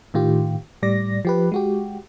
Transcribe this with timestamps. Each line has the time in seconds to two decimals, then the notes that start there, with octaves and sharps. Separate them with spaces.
0.14 A2 D#3 F4 G4
0.82 A2 G3 D5 A#6
1.25 F3 G4 B4
1.52 G#3 F#4 G4